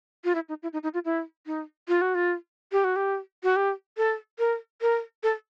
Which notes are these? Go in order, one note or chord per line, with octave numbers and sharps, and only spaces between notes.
F4
E4
D#4
E4
D#4
D#4
F4
E4
D#4
F4
F#4
F4
G4
F#4
G4
F#4
G4
A4
A#4
A#4
A4